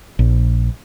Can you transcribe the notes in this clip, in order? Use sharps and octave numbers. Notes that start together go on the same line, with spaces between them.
A#1